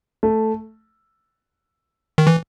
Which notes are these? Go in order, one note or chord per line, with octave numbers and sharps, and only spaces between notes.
A3
D#3
E3